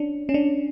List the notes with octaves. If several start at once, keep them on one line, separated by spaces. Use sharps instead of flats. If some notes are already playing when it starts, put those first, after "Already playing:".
Already playing: C#4 D4
C#4
D4